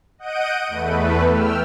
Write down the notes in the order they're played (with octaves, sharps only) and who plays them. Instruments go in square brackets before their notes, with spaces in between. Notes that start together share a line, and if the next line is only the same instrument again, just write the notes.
[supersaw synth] D#5 F#5 G6 D7 D#7
E2 A3 B4
G5 E6 F6